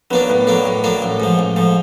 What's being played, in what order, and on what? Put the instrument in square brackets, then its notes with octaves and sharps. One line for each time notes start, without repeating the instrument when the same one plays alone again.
[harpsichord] F#3 A#3 D4 [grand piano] B3 B4
[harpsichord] A2 [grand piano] B3 B4
[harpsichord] F#3 A#3 D4
A2
F#3 A#3 D4
A1
G#2 F3
A1
G#2 F3